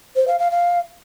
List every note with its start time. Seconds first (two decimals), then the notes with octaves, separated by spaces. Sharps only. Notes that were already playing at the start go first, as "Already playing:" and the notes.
0.16 C5
0.27 F5
0.39 F5
0.50 F5